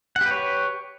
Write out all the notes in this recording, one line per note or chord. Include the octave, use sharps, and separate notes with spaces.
G4 B4 C#5 F#5